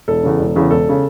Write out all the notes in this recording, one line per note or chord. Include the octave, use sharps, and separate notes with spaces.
E1 A4
E2 C#3
E1
E2 C#3
E1 A4
C#3